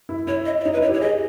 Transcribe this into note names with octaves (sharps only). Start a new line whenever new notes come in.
E4
E4 C#5
D#5
D#5
D#4 C#5
B4
E4 C#5
G4 C#5
G#4 D#5